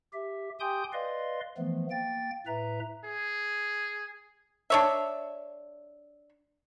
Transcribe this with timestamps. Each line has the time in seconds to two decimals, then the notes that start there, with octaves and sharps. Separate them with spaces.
0.13 G4 E5
0.60 G4 G5 G#5 C6 D#6 G6
0.93 B4 D5 D#5 F5 C6
1.58 E3 F3 A3 B3
1.90 A#3 G5 A6
2.47 A2 B4 E5 A#5
3.05 G#4
4.70 D4 C#5 E5